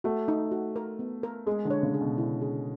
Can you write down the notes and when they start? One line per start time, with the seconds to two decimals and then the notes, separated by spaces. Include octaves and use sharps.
0.04 A3 F#4
0.28 D#4
0.51 F#4
0.76 A#4
0.99 B3
1.23 A#4
1.47 G#3 G#4
1.65 D3
1.70 C#5
1.83 C#3
1.94 G#4
2.01 B2
2.18 E4
2.41 G#4